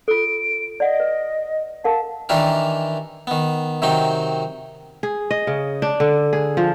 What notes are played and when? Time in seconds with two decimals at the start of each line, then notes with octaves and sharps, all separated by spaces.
0.08 F4 A4 D7
0.80 D5 D#5 F#5
1.00 B4
1.84 A#4 F5 F#5 A5
2.29 D#3 E3 D4 G4 A#4
3.27 D#3 B3
3.82 C3 D#3 F#3 D#4 G5
5.03 G#4
5.31 D#5
5.47 C#3
5.82 D4
6.00 D3
6.33 G#4
6.57 F3